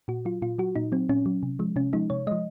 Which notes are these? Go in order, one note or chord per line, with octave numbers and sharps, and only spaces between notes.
A#2 F#4
F#3 F4
A#2 F4
F#3 F#4
A#2 D#4
F#3 C4
A#2 C#4
F#3
C3
F3 G#3
C3 C#4
F3 G#3 D#4
C3 C#5
F3 G#3 D#5